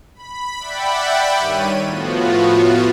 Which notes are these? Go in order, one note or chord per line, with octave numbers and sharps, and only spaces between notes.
B5
D5 E5 F#5 G5 B5
G2 D#3 G3 C#5 D#7
A2 F3 B3 F4 F#4